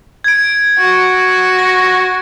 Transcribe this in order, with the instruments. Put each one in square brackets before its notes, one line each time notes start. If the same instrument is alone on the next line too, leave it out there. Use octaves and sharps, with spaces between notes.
[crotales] G#6 D7
[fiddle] F#4
[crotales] A#6